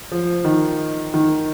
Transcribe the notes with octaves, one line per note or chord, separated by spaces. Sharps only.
F3
D#3
D#3